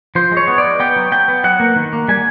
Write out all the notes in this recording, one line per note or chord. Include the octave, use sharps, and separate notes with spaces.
F3 C5
G#3
C#5
B3
D5
G#3
B3 G5
F#3
B3 G5
B3
F#3 F#5
A#3
D#3
A#3
G3 G#5